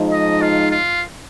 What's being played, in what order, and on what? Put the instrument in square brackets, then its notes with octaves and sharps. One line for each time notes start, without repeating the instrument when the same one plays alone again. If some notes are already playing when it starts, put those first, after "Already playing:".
Already playing: [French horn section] F3 G#3 D#4
[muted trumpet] D#5
F4
F4